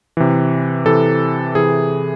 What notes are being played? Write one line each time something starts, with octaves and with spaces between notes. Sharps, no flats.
C3 E3
C3 E3 A4
C3 E3 G#4